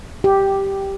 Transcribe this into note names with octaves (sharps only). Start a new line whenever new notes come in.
G4